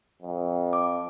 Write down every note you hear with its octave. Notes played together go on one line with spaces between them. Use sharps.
F2
D6